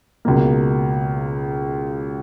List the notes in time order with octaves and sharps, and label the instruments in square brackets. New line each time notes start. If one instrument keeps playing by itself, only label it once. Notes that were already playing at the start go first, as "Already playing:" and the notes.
[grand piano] C#2 B2 A#3